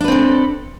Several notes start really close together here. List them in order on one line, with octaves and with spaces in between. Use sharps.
D4 B4 C4 A4